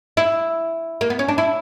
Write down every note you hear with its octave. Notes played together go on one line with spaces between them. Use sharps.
E4
A#3
B3
C#4
D4
E4